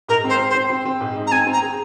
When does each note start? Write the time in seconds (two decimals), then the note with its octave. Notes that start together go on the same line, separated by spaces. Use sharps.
0.09 G#2 A#4
0.24 C4 C5
0.39 C4
0.50 C5
0.55 C4
0.70 C4
0.85 C4
1.01 G#2
1.16 D#4
1.27 A#5
1.32 C4 G#5
1.47 C4
1.53 A#5
1.62 G#4